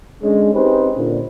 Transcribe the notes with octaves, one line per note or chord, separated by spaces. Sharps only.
D3 G#3 C#4
C4 C#4 D#4 G4 B4 C5
A#2 D3